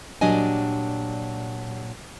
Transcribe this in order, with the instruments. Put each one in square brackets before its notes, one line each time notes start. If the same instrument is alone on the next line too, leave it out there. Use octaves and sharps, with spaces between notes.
[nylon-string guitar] A#2 F#3 G3 D4 D#5 G#5